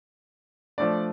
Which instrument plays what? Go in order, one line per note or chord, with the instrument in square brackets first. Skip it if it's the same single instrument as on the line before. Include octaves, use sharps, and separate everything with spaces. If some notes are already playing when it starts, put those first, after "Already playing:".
[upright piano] F3 A3 D4 D5